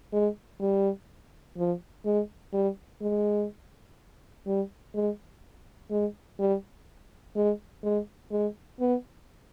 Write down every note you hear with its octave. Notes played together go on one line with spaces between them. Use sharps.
G#3
G3
F3
G#3
G3
G#3
G3
G#3
G#3
G3
G#3
G#3
G#3
B3